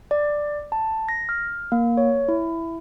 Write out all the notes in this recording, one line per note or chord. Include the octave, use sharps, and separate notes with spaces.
D5
A5
A#6
F6
A#3
C#5
E4